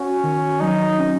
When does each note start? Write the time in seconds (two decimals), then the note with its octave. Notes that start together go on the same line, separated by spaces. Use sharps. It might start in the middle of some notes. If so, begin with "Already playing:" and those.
Already playing: C#4 F#4
0.23 D#3
0.60 F#3 D#4
0.99 C#4